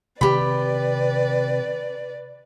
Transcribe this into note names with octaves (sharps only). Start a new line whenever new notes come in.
C3 D#3 C4 G4 B4 D5 B5